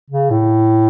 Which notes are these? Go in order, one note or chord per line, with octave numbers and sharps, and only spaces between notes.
C#3
A2